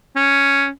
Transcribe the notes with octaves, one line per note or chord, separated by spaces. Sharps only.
C#4